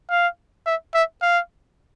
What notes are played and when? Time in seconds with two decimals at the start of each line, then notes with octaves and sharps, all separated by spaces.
0.10 F5
0.67 E5
0.94 E5
1.22 F5